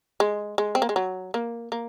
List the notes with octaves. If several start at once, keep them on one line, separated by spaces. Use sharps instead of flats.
G#3
G#3
C4
A#3
G#3
F#3
A#3
A#3